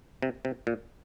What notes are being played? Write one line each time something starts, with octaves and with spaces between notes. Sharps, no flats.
C3
C3
A#2